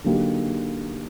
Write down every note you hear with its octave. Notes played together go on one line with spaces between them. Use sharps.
D3 F#3 A#3 D#4 G4